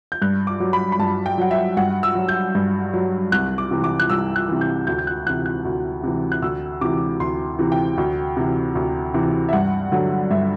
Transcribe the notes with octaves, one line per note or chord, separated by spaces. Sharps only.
G6
G2 F#6
D6
F#3
B5
B5
G2 A5
G5
F#3 F#5
E5
G2 F#5
E6
F#3
G6
G2
F#3
C2 F#6
D6
C3 E3
D6
F#6
C2 E6
F#6
C3 E3
G6
D2 G6
G6
F#6
C3 E3 F#6
F#6
D2
C3 E3
F#6
D2 E6
C3 E3 D6
D2 C6
C3 E3
G5
D2
C3 E3
D2
C3 E3
E5
G2 F#5
D3 F#3
G2 E5